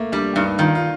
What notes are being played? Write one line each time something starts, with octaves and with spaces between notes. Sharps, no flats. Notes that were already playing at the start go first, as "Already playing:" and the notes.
Already playing: A3 A#3
G3 D4
G2 D#4
D#3 F4
F4